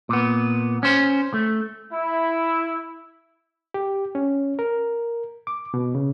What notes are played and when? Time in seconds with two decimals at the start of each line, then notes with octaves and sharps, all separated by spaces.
0.09 A#2 B3
0.83 C#4 C5
1.34 A3
1.92 E4
3.74 G4
4.15 C#4
4.59 A#4
5.47 D6
5.74 B2
5.95 C#3